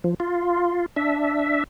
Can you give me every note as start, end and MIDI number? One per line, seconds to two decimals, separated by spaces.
0.04 0.14 53
0.20 0.86 65
0.96 1.64 62
0.96 1.64 76